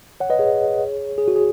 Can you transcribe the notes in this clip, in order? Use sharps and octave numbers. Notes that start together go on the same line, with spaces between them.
C#5 F#5
B4 D#5
G#4 C#5
G#4
F#4
G#4